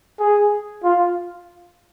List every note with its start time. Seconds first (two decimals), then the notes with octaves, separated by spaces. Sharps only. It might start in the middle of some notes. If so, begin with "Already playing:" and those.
0.20 G#4
0.84 F4